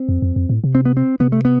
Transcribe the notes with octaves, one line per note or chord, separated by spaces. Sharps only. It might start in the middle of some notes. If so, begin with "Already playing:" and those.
Already playing: C4
F2
F2
F2
A2
C3
C4
B3
C4
C3 B3
A3
B3